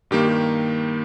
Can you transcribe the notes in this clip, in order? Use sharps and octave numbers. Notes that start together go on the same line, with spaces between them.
G2 D#3 A#3 G4
G4